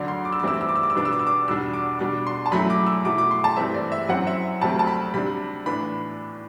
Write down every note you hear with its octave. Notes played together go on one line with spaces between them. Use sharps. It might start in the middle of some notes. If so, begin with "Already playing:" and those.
Already playing: D2 D3 F#3 D5
C6
D6
E6
D6
G2 E3 A3 C4 E4 E6
D6
E6
D6
E6
D6
E6
B2 G3 B3 D4 D6
E6
D6
E6
D6
E2 B2 G3 D4 E6
D6
B2 G3 D4 D6
C6
A5
F#2 F#3 A3 E4 B5
D6
E6
B2 F#3 A3 E4 D6
D6
C6
A5
G2 E3 A3 C4 E5
D5
E5
F#2 F#3 C4 E4 F#5
E5
D2 C3 F#3 A3 C4 A5
A5
B5
C3 G3 D4 B5
A2 E3 B3 D4 B5